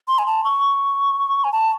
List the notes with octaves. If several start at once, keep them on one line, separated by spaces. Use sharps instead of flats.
C6
G#5
A5
C#6
G#5
A5